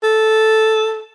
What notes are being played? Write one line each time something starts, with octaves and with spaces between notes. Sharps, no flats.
A4